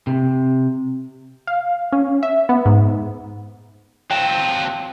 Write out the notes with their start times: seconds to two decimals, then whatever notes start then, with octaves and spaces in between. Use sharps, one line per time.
0.07 C3
1.47 F5
1.92 C#4
2.23 E5
2.49 B3
2.66 G#2
4.11 F#3 C4 F5 G5 A5